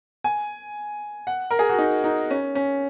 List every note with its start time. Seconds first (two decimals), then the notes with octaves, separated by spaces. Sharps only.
0.24 G#5
1.27 F#5
1.51 A#4
1.59 G#4
1.69 F#4
1.78 D#4
2.04 D#4
2.31 C#4
2.55 C#4